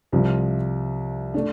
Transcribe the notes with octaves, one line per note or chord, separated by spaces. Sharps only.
C2 C3 F3
A3 D4